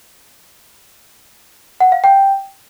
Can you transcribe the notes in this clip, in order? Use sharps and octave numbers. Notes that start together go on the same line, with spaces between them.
F#5
F5
G5